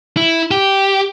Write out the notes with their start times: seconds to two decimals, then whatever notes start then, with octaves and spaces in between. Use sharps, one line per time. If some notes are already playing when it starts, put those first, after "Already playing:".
0.17 E4
0.51 G4